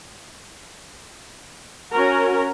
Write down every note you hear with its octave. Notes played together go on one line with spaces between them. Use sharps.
C#4 F#4 A#4